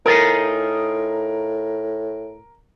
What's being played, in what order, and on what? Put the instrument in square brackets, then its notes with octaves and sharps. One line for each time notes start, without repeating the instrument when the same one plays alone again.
[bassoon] A2 [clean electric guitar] D#4 F4 G#4 [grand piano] A#4